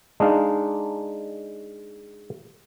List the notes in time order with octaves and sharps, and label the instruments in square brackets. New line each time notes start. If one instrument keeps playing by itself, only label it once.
[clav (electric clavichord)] G#3 D4 D#4 F5